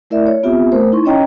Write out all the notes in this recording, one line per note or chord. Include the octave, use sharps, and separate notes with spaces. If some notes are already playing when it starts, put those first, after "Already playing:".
A3 E4 A#4 D5 E5
C#5
B3 C4 F4 G4 E5
A3 A#4 C5
D#4 E4 C6 C#6
C#4 C#5 D#5 G5 A#5